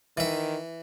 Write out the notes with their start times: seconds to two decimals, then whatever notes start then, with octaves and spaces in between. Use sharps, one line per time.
0.17 D#3 E3 E5